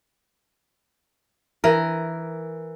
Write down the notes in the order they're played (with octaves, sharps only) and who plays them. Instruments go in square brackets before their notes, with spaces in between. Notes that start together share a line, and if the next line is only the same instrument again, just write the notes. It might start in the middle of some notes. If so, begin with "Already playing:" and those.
[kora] E3 A#4